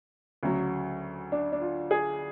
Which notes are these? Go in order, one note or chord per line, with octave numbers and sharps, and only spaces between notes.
D2 C#3 F#3
D4
D4
F4
G#4